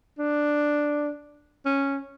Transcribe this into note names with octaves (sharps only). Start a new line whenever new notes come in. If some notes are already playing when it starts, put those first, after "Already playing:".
D4
C#4